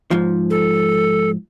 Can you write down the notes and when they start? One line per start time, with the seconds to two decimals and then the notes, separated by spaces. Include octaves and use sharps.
0.11 G#2 F3
0.50 A4